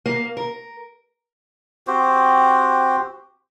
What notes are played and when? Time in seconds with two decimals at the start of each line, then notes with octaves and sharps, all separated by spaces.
0.06 A#3
0.37 A#4
1.87 C4 F#4 G4 C5